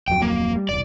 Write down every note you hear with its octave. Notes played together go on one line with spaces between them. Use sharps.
D1 F2 F#3 G5
A#3
G3
E1 C2 D5